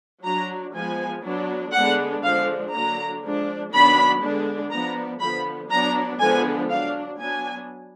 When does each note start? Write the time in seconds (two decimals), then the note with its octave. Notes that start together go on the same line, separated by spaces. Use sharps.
0.25 F#3 D4 A#5
0.74 F3 G#3 B3 G#5
1.24 F#3 B3 D4
1.73 D3 G#3 B3 D4 F#5
2.23 D3 F3 G#3 D4 F5
2.73 D3 F#3 A#3 D4 A#5
3.22 F3 G#3 D4
3.72 D#3 F#3 B3 D4 B5
4.21 D3 G#3 B3 D4
4.70 F3 B3 D4 A#5
5.20 D3 F3 B3 B5
5.70 F#3 B3 D4 A#5
6.20 D3 F3 G#3 B3 D4 G#5
6.69 F#3 D4 F5
7.19 F#3 B3 D4 G#5